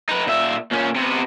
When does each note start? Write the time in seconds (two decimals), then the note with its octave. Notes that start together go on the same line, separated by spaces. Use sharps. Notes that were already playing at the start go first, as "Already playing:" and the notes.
0.09 D#4 B4
0.27 A#2 E5
0.72 A#2 C#4
0.96 C3 B3